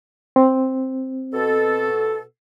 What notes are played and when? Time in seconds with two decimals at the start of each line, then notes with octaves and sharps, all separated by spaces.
0.36 C4
1.33 B2 A4